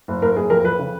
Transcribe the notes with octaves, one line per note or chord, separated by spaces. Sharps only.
F#1
F#1 A#4
F#1 G#4
F2 A#4
F2 B4
C#3